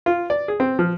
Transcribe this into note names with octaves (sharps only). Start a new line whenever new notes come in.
F4
D5
G#4
C4
F3